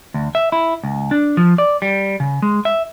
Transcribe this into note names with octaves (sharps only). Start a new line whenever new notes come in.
D2
E5
E4
C#2
D4
F3
D5
G3
C#3
G#3
E5